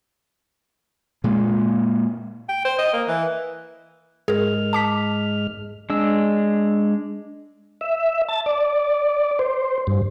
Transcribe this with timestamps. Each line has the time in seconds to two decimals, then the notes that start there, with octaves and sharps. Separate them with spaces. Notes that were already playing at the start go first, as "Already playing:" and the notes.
1.24 A#2 G#3 A#3
2.49 G5
2.65 C5
2.79 D#5
2.93 A#3
3.08 E3
4.28 G#2 G#3 G#4 A#4 F6
4.73 A5 D6 B6
5.90 G#3 D4 E6
7.81 E5
8.29 A5
8.46 D5
9.39 C5
9.87 G2